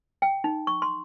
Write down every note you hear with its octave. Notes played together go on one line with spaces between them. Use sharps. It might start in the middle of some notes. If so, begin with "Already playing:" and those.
G5
D#4
C#6
C6